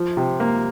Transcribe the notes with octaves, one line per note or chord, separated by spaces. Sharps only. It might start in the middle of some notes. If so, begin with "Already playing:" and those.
Already playing: F3
C3
A#3